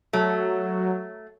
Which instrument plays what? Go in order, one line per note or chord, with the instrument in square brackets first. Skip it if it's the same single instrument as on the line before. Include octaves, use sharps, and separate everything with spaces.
[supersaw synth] F#3 [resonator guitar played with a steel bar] A3